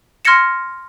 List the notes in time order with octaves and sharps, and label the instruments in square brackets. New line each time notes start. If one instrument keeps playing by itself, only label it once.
[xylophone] C6 F6 G#6 A#6 C#7 E7